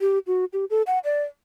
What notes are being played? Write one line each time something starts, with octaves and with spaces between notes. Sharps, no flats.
G4
F#4
G4
A4
F#5
D5